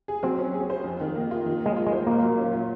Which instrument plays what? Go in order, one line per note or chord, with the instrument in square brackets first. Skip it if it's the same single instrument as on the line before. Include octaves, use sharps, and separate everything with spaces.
[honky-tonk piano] G#4
[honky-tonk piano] F#3 [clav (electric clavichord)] C4
[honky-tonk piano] C#4
G#4
C5
F2
D#3
A#3
F4
D#3
A#3
[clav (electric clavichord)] G#3
[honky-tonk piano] F4
[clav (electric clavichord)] G#3
[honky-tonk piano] C5
[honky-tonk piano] A#2 [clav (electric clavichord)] A#3
[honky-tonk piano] F#3
C#4
F4